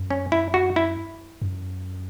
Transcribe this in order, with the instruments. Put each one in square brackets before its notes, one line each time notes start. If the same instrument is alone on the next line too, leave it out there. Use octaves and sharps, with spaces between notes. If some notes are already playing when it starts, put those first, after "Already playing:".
Already playing: [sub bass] F#2
[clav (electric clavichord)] C#4
E4
F#4
E4
[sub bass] F#2